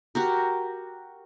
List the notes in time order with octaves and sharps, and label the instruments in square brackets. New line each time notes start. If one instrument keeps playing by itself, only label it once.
[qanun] F#4 G4 A#4